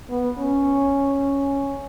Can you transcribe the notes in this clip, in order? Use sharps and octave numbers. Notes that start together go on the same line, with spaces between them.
B3
C#4